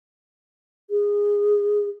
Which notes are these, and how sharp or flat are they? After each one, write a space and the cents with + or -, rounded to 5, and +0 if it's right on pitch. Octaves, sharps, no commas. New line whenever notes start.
G#4 -15